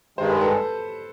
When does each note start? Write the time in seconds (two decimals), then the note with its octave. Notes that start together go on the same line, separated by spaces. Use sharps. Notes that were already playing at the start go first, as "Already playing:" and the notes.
0.18 G2 D#3 G#3 C5
0.30 B4
0.41 A4